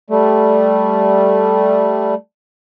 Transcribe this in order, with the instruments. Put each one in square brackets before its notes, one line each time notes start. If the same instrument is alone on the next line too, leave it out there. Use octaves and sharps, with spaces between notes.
[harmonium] G3 A3